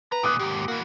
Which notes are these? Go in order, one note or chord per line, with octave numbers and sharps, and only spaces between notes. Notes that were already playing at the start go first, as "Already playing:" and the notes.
B4 A#5
A#2 D#3 D6 D#6 F#6
D#2 G#2 G4
E3 A#3 F#4